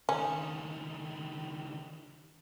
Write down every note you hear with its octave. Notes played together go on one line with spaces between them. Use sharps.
C#2 D#3 C#4